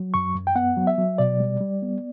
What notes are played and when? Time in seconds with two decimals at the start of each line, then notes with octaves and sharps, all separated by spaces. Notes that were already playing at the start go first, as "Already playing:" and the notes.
Already playing: F#3
0.14 F#2 C#6
0.35 F#2
0.47 G5
0.55 B3 F#5
0.77 F#3
0.87 E5
0.98 F#3
1.18 B2 D5
1.40 G3
1.60 G3
1.82 B3